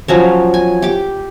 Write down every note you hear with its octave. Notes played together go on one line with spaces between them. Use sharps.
F3 F#3 C#4
G#5
G4 D6